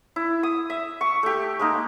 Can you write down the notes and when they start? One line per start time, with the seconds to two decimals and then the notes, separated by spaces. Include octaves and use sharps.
0.16 E4
0.43 D#6
0.70 E5
1.01 C#6
1.23 A3 G4
1.59 G#3 A#3 D#4